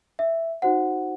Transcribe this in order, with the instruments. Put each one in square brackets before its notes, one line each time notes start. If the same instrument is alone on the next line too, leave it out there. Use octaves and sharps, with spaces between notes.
[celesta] E5
D#4 F#4 C5 F#5